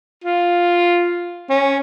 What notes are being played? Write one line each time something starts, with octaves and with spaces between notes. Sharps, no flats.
F4
C#4